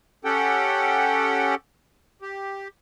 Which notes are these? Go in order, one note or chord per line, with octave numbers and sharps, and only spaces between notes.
C#4 G4 A4 F#5 G5
G4